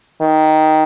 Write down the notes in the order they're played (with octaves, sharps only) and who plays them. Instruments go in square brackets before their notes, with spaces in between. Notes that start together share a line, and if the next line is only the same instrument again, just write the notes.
[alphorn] D#3